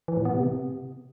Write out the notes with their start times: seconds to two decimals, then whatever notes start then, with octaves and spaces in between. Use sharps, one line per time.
0.08 E3
0.17 A2
0.25 B3
0.34 C3